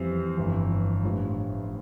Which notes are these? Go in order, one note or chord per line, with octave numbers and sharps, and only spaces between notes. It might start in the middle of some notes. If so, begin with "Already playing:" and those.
Already playing: F2 E3 G3 C4
G1 F2 E3
A1 G2 F3